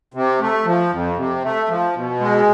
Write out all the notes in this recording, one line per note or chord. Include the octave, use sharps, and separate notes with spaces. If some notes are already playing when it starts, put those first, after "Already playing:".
C3
A3
F3
F2
C3
A3
F3
B2
G#3